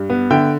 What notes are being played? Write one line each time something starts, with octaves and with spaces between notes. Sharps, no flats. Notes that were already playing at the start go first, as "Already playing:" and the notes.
Already playing: G2
B3
D3 E5 G5